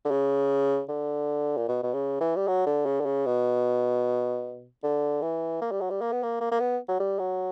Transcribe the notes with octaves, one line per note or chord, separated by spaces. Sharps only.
D3
C#3
D3
A#2
B2
B2
C#3
E3
G3
F#3
D3
C#3
D3
C#3
B2
D3
E3
A#3
G3
F#3
G3
A#3
B3
A#3
A#3
A#3
B3
F#3
G3
F#3